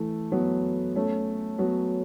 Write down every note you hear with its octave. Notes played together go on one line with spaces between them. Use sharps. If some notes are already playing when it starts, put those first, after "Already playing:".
Already playing: E3 A3
F#3 B3
A3 C#4
F#3 B3